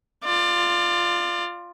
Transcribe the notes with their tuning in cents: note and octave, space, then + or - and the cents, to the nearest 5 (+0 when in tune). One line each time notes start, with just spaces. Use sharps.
F4 +0 D5 +30